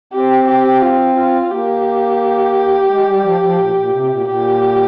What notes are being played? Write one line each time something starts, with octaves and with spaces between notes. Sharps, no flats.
C4 G4
G4
F4
F4
A#3 G4
G#3
G3
F3
F3
A#2
A#2
C3
A#2
A#2 G4